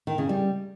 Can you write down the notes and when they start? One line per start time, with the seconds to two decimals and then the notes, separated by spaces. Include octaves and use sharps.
0.07 D#3
0.18 C#3
0.29 G3